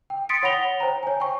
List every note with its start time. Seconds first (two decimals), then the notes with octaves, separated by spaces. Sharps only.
0.10 G5
0.29 C6 D#6 A6 B6 C#7 D7
0.43 C#5 F#5 B5 A#6 F7 G7
0.80 C5 G5 A#5
1.03 C#5 G#5
1.20 G5 C#6